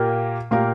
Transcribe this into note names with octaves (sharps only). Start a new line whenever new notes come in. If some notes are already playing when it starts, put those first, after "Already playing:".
Already playing: A#2 A#3 G4 A#4
A#2 A#3 G4 A#4